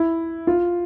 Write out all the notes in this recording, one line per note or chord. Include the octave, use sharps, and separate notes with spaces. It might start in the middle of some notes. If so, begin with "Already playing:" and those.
Already playing: E4
F4